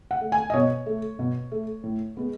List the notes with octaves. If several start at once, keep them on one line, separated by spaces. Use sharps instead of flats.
F#5
A3
G#5
D#5
B2 C#5
A3
B2
A3
A2
G#3 B3